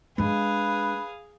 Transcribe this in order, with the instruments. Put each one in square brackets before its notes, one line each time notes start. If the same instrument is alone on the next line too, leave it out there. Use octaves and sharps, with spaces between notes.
[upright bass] G#3 D4 [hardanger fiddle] G#4 F5 [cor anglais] B4